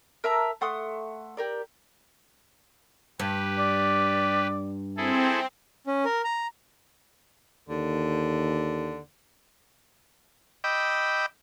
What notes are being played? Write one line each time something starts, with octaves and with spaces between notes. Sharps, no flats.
A#4 E5 A5 A#5
A3 F#5 C6 D#6
G4 A#4 D5
G2 G4 B4
D5
C4 E4 G#4 A4
C#4
A#4
A#5
D#2 D3
D#5 G5 B5 D6 E6